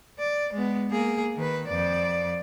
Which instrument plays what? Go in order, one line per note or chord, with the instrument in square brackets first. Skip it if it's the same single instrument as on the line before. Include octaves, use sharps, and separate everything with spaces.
[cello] D5
G#3 B3
A#3 G#4
D#3 B4
F2 D5